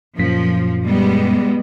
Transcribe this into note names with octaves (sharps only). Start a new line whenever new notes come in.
F#2 A#2 F3 B6
G3 G#3 B3